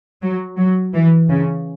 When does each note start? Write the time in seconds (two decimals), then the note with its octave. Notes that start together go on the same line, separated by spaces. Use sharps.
0.22 F#3
0.57 F#3
0.94 E3
1.30 C#3